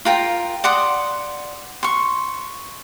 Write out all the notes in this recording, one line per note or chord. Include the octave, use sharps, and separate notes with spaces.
F4 A#4 G5
D5 F#5 C6 D#6
C6 C#6